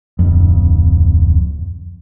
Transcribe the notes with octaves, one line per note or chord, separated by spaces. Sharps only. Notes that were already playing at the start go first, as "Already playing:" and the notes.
D1 F2